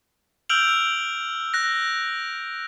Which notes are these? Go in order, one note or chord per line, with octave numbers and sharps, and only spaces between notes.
E6 F6 G6 D7 F7 F#7
F#6 A#6